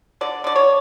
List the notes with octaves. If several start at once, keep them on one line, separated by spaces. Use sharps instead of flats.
D3 D5
D3 D5
C#5